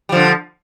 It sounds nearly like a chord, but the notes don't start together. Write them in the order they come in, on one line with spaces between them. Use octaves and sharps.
G3 F3 D3